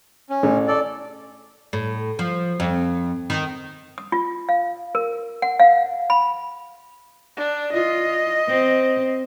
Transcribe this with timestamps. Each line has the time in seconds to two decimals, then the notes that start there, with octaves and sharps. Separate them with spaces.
0.30 C#4
0.43 A1
0.68 A4 D5
1.73 A2
2.19 F3
2.60 F2
3.30 D#3
3.98 D#6
4.12 F4
4.49 F5
4.95 A#4
5.42 F#5
5.60 F5
6.10 B5
7.37 D4
7.73 F4 D#5
8.48 C4